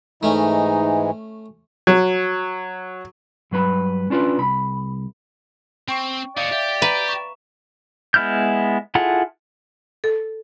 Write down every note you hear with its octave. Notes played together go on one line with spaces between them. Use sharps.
G#2 E3 G#3 A3 C#4 D#4
F#3
G2 F#3 B4 B5
C#4 D4 F4 B4
C2 B5
C4 G5 C#6
D#4 C#5 D5 F5
G4 E5
B4 A#5
C#6 E7
G#3 B3 E4 F6 G6
E4 F4 G#4 A4 F#5
A4